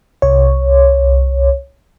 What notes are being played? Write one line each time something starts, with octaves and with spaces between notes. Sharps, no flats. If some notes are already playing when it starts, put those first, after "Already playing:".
C2 C#5